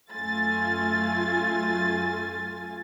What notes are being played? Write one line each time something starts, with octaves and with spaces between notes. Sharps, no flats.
F#2 A3 F4 G#5 A6